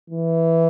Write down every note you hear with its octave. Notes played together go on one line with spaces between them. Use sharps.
E3